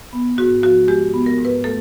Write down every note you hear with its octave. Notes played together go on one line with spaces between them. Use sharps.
B3
G#2 F#4
F3 F#4
G#3 G4
B3
A#4
G#2
B4
A3 A4